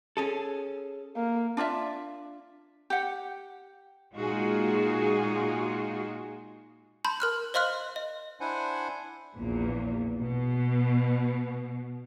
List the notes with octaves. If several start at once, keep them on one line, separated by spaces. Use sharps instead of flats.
C#4 G#4 A4
A#3
D4 F4 D5 E5
G4 F#5
A#2 G#3 D#4 F4 F#4 G#4
A5 B5 C6 G6
A#4 F6 F#6
C5 D#5 F5 C6 F6 F#6
D#5
D4 E4 C5 F#5 G#5
A#1 E2 A#2
B2